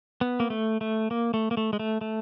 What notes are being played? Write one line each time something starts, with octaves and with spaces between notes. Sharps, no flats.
B3
A#3
A3
A3
A#3
A3
A#3
A3
G#3
A3
A3